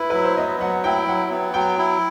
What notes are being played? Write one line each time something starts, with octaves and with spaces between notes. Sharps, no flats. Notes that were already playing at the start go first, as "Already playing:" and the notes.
Already playing: E4 B4
F#3 B4
C5
B3 D#5
F#3 F#5
E4 G5
F#3 F#5
B3
F#3 G5
E4